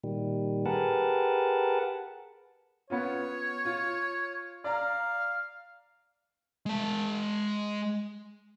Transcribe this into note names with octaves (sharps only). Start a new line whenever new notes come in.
A#2 D#3 G3
G4 G#4 A#4 B4 F#5 A5
B3 C#4 F4 C#5
F4
D5 F5 A#5
G#3 A5